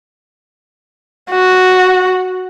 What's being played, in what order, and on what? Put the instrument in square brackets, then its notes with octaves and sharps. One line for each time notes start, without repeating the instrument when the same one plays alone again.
[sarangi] F#4